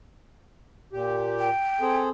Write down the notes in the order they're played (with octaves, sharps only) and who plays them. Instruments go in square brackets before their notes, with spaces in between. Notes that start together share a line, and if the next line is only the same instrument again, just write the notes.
[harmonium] A#2 G4
[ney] G5
[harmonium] C4 G#4 A4